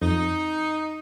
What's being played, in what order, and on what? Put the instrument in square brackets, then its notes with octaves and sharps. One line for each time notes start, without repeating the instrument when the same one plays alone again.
[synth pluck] F2 [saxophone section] D#4